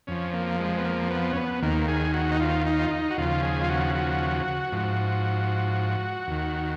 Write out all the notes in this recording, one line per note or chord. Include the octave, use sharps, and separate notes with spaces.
F2 F3 C#4
A#3
G#3
B3
A#3
B3
C#4
B3
D#2 D#3 A#3
G#4
F#4
D#4
F4
D#4
F4
D#4
F#4
D#2 C#3 F3 F4
G#4
F4
F#4
F#4
G#2 F3
D#2 D#3